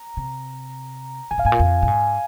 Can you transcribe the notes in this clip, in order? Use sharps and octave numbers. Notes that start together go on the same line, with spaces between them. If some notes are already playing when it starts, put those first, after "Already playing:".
Already playing: A#5
C3
C3 G#5
A#2 F5
G#2 G#5
A#2
F2
A#2
G#2